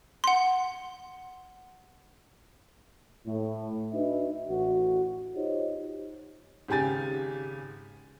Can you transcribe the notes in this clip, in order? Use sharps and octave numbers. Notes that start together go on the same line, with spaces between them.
F#5 C6
A2
D4 D#4 F#4 B4 D#5 E5
A1 F#4
D#4 F4 G4 C5 C#5 D#5
G#1 C#3 G4 G#5 A6